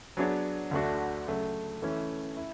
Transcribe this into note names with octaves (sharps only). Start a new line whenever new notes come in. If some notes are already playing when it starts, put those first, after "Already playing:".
F#3 B3 D4 G#4 C#5
D2 D3 A3 D4 F#4
C#3 F#3 A3
E3 A3 C#4 E4
E4